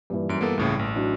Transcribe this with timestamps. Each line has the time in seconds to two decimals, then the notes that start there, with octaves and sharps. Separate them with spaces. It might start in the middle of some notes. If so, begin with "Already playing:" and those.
0.10 G2 A#2 E3
0.29 F#2 D7
0.41 A#3 B3 A4
0.57 C#2 A2 C#3
0.79 A1
0.95 E3 F#3 D4